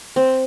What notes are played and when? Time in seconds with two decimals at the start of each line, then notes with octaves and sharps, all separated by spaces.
0.16 C4